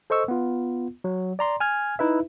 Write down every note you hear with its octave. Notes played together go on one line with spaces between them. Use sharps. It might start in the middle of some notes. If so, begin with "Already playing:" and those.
A4 C5 D#5 C#6 E6
B3 F4
F#3
D5 A#5 C6
G#5 F6 G#6
D#4 E4 B4 E5